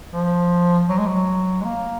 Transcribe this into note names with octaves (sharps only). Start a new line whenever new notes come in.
F3
F#3
G#3
F#3
G#3
A#3